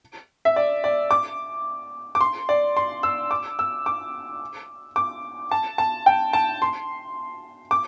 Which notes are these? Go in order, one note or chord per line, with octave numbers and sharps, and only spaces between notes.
E5
D5
D5
D6
D6
C6
D5
C6
E6
D6
E6
D6
D6
A5
A5
G5
A5
C6
D6